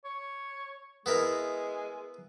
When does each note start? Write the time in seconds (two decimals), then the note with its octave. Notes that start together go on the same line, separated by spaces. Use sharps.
0.05 C#5
1.06 G#3 B3 E4 A#4